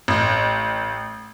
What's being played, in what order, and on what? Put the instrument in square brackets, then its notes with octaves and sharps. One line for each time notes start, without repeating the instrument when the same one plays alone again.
[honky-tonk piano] A1